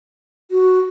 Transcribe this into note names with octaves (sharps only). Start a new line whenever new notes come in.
F#4